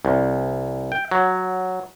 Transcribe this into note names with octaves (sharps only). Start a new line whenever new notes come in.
C2
G5
F#3